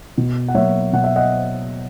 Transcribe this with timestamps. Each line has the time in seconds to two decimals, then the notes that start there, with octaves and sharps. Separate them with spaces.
0.18 B2
0.48 F#5
0.54 F#3 A#3 C#5 E5
0.93 B2 F#5
1.04 E5
1.16 D#5 F#5